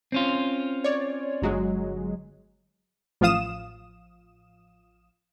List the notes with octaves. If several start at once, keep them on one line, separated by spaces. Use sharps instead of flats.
C4 C#4 F4
C#5 D5
G1 F#3 G#3
A1 F3 F4 F5 D#6 E7